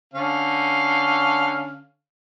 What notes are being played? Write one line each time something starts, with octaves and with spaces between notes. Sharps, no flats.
D3 C#4 F5